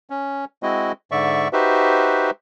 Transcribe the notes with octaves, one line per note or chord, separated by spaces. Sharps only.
C#4
G#3 C4 E4 F#4 D#5
G#2 D3 D5 E5 C#6
D#4 F#4 G4 B4 C5 E5